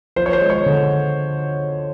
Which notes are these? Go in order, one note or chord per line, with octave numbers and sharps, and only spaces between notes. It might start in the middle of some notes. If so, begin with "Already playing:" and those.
F3 C5
C#5
C5
G#3
C#5
D3